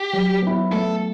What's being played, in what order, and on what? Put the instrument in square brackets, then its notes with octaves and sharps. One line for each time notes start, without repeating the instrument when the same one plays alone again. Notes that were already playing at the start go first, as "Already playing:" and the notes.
Already playing: [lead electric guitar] G4
[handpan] F#3
B3 E4
[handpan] A3 [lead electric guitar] A4